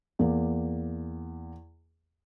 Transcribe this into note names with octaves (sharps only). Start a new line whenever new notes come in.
E2 A#3